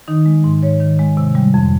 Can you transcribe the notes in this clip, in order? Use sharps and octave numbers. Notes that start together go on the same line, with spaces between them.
D#3 D#4
G#3
G#2
G#2 C#5
D#3
G#3
C3
G3
F2